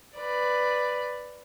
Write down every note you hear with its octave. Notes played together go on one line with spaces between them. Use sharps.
B4 D5